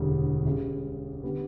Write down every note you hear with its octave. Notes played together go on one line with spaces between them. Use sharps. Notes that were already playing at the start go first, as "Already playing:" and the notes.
Already playing: E1 D2 C#3 G3
C#2 C#3 G3
D3 G3 B3